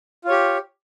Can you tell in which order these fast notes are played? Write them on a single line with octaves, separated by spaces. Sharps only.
F4 C#5 G4